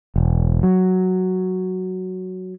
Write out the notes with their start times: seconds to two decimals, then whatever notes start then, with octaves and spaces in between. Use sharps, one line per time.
0.16 E1
0.63 F#3